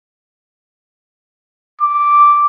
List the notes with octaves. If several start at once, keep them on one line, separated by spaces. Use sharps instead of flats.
D6